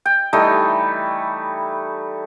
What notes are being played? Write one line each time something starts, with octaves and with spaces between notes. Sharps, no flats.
G5
E3 G3 A3 D#4